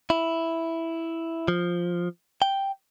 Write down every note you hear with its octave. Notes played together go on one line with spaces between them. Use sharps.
E4
F3
G5